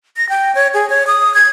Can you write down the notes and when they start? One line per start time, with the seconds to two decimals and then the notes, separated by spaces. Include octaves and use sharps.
0.17 A#6
0.29 G5
0.55 C#5
0.74 G#4
0.90 C#5
1.07 D#6
1.34 G#6